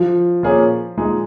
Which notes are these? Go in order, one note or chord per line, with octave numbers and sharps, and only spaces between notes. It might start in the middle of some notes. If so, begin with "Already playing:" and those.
Already playing: F3
A#2 A#3 C#4 G#4
A#2 G#3 D#4 G#4